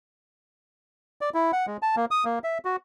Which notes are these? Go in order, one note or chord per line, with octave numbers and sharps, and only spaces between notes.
D5
E4
F#5
G#3
A5
A#3
D#6
A#3
E5
F#4